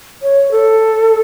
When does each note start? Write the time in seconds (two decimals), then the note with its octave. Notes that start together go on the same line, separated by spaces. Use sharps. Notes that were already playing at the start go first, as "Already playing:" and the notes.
0.23 C#5
0.52 A4